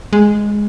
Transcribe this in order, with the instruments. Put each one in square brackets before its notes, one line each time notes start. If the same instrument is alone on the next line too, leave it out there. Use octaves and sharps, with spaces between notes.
[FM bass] G#3